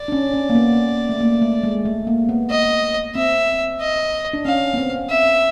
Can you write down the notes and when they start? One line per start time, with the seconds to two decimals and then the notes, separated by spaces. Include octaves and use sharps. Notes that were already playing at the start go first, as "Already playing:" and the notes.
Already playing: D5
0.08 D4
0.12 C#4
0.34 C#4
0.50 A#3
0.55 B3
1.09 A3
1.20 A#3
1.42 A3
1.64 G#3
1.85 A3
2.07 A#3
2.29 B3
2.50 D#5
3.15 C4 E5
3.80 D#5
4.33 D4
4.45 C#4 F5
4.74 B3
4.77 C4
5.10 E5